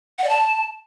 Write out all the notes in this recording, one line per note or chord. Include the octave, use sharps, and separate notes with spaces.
F#5
D5
A5